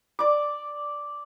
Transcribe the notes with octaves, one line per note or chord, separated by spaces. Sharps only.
D5 D6